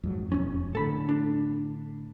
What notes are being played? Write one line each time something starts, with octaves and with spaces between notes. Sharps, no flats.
F2 G#2 F#3
E1 A#1 F2 C#4
A2 D3 A4 B5
D4